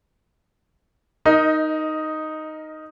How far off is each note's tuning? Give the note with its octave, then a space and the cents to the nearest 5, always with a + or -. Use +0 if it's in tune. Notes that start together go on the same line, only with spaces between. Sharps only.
D#4 +0 A#4 +0 D#5 +20